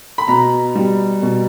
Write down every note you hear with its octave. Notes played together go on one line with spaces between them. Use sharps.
B5
B2 A#5
G3
B2